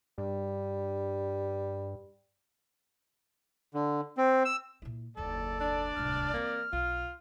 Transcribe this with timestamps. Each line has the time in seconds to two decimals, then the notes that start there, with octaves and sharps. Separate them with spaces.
0.18 G2 G3
3.74 D3
4.17 C4
4.45 E6
4.82 A#2 E4
5.17 F#1 D#2 A4 D5
5.61 D4 D5
5.97 D1 C2 F6
6.34 E3 A#3 C4
6.73 B1 F4